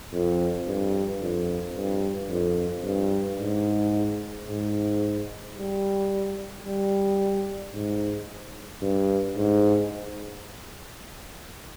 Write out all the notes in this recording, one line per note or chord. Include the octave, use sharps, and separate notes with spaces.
F2
G2
F2
G2
F2
G2
G#2
G#2
G3
G3
G#2
G2
G#2